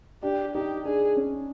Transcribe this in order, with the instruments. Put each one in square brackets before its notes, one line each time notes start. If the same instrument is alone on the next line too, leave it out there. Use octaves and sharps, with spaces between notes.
[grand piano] D4 [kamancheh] G4
[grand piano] D#4 [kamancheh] G4
[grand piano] D4 [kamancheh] G#4
[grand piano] C#4